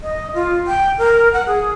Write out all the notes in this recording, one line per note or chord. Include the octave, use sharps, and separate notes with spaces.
D#5
F4
G5
A#4
F#5
G#4